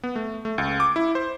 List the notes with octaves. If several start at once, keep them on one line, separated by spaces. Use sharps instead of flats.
B3
A3
A3
C#2
D6
E4
C5